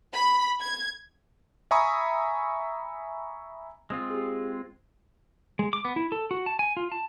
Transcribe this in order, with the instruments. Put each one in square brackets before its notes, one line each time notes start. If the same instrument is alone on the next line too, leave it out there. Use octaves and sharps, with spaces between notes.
[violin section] B5
G#6
[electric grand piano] E5 G#5 A#5 B5 C#6 D#6
[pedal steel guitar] G#3 C4 F4 [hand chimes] D#6
[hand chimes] G4 G#4
[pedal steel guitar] G#3
D6
B3
E4
A4
F#4
A5
G#5
F4
A5